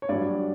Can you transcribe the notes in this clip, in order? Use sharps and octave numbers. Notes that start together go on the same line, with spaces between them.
C#5
G2 F#3 D5